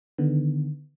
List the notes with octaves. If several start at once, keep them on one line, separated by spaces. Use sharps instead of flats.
D3 D#3 B3